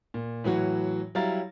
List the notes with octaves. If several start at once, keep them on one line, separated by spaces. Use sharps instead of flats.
A#2
A2 E3 F#3 F#4
F#3 G3 E4 F5 A#5 A6